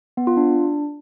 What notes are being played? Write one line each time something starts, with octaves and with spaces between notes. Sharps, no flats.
B3
F4
D4